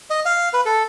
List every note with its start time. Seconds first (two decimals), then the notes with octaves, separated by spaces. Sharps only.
0.10 D#5
0.25 F5
0.53 B4
0.66 A4